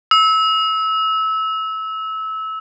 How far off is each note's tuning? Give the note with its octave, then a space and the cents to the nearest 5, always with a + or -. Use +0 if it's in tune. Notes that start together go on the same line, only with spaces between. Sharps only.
E6 -25